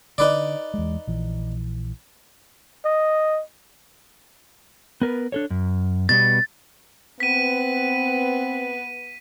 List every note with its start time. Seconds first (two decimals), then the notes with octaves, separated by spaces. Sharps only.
0.18 D3 D#4 B4 D5
0.74 E2 G#3
1.07 A#1 E3
2.85 D#5
5.01 B3 A#4 B4
5.32 D4 A4 C#5
5.50 F#2
6.09 B2 G3 B3 A6
7.20 B3 C4 B4 B6 D#7